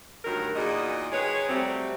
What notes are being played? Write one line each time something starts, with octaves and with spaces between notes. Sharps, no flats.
D2 G2 D#3 F#3 A#4
E2 A#2 D#4 F#4 G#4 D#5
D#3 G#3 G#4 B4 C#5
C3 F#3 G3 A3 C4